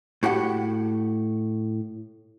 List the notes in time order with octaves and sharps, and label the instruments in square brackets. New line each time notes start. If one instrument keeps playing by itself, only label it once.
[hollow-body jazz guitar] A2 F#4 G4 F#5